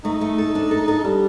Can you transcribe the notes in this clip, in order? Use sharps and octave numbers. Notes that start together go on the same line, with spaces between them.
A3 D#4
A3
A4
D4
A4
A4
G3 D4